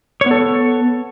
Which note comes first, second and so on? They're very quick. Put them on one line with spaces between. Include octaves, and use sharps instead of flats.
C#5 B3 A4